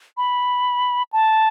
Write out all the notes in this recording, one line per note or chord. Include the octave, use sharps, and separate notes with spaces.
B5
A5